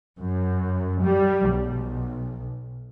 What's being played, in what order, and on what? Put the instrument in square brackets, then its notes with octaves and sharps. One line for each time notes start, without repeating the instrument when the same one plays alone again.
[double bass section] F#2
G3
B1